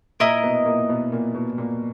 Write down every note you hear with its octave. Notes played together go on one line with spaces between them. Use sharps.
A#2 A#3 E4 A#4 D#5
B2 B3
A#2 A#3
B2 B3
A#2 A#3
B2 B3
A#2 A#3